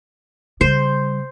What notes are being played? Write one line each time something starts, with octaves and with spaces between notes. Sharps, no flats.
C#3 G3 C5